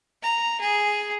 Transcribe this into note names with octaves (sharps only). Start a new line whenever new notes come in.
A#5
G#4